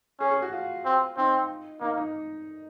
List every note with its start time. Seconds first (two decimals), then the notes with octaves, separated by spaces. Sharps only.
0.20 C#4 G#4
0.31 G#4
0.42 F#4
0.53 F4
0.85 C4
1.17 C4 D#4
1.81 A#3 D#4
1.97 D#4